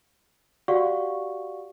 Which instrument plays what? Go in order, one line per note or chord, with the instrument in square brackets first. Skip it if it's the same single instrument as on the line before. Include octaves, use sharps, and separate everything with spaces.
[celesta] F#4 G4 D5 F5 F#5 C#6